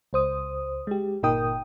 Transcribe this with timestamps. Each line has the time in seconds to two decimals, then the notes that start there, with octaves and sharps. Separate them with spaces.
0.13 C#2 C5 D#6
0.87 G#3 G4
1.23 G1 A#2 D#4 A#4 G5 D#6